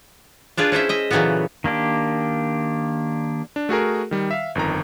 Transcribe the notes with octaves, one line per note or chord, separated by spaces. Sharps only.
D4 F4 G#4 B4
C#4 E4 C5 E5
D#5 E5
A#2 C#3 E3 F#3 A3 B3
D#3 A#3 D4 G4
D4
A3 F#4 G#4 A#4
D#3 G3
E5 F5
G1 F2 D#3 A#5